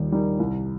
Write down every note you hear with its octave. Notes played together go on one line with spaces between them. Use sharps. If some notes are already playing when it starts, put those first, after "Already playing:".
Already playing: D#2 D#3 G3 D#4
D#3 G3 D#4
C2